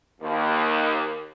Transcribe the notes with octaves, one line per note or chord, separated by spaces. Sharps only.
D#2